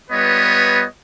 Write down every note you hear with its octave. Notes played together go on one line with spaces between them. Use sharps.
G3 B3 F4 B4 C#5 D#5